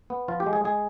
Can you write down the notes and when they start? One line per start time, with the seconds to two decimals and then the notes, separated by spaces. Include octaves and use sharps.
0.10 B3
0.28 F3 F4
0.40 G4
0.46 G#3
0.53 G#4
0.65 G#3 G#4